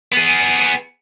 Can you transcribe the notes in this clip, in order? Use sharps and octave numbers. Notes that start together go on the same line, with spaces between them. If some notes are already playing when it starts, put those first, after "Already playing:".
B3 G#4